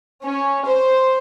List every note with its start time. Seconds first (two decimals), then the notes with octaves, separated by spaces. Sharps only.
0.23 C#4
0.65 C5